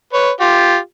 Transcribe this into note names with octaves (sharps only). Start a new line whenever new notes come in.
B4 C#5
F4 G4